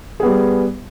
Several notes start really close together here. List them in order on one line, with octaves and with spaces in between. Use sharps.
G#4 B3 G3